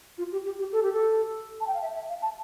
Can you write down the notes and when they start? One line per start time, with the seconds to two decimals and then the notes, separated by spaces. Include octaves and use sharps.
0.18 F4
0.32 G4
0.46 G4
0.59 G4
0.72 A4
0.83 G4
0.92 A4
1.61 A5
1.67 G5
1.74 F5
1.82 E5
1.95 E5
2.09 F5
2.22 A5